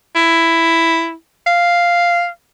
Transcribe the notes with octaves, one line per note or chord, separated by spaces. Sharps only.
E4
F5